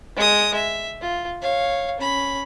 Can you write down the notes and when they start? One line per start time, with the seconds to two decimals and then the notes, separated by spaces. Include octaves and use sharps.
0.16 G#3 D#6
0.55 E5
1.01 F4
1.42 C#5 F5
2.00 C#4 B5